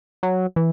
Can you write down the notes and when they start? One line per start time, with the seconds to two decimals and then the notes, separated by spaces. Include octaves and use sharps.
0.23 F#3
0.56 E3